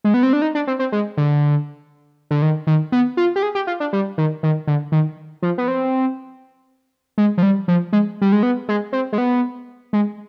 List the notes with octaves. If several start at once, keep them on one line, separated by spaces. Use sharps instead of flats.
G#3
B3
C4
D4
D#4
D4
C4
C4
G#3
D3
D3
D#3
D#3
B3
F4
G4
G#4
G4
F4
D4
G3
D#3
D#3
D3
D#3
F3
B3
C4
G#3
F3
G3
F3
G#3
G3
G#3
B3
G#3
C4
G#3
B3
G#3